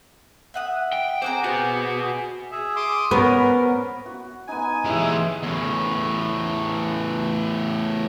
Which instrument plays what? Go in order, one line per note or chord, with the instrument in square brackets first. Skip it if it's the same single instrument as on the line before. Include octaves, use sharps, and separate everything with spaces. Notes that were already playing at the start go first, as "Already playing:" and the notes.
[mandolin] E5 F#5 D#6
[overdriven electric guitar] G5
[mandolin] C4 F#5 A#5 [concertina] G#4 D6 [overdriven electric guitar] C5
[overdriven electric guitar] B3 F#4 [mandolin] G6
[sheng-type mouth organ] G#4 E5
C6 D6 D#6
[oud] B3 [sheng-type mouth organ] C#4 A#4
[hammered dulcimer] F#4
[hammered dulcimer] B3 D#4 [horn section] G#5
[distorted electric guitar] E3 G4 [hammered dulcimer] G#3 E5
[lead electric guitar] E2 A2